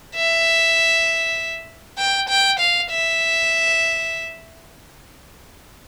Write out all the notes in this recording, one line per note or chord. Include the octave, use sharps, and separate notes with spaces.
E5
G5
G5
F5
E5